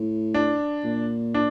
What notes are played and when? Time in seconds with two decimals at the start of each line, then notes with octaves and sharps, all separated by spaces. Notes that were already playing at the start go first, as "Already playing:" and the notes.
Already playing: A2
0.34 D4
0.84 A#2
1.34 D4